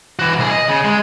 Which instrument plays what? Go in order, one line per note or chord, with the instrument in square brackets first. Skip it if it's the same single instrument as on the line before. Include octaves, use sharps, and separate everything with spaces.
[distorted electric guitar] E3 F#4
C2 G#4
D#5
C#3
G#3